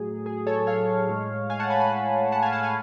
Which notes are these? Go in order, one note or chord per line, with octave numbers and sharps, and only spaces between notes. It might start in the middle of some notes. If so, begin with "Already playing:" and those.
Already playing: A2 F#3 G#4
G#4
A4 C#5
C#5 F5
A2 G#3
F5 G#5
F#5 A5
G#5 B5
G#5 B5
F#5 A5
F5 G#5
F#5 A5
F5 G#5